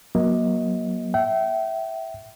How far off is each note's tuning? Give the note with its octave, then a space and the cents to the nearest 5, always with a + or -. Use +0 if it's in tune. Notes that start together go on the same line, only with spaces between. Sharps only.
F#3 +0 A#3 +30 D#5 +25
E5 +0 G5 -35